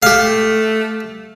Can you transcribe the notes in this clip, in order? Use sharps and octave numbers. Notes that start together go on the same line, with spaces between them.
A3 G4 F5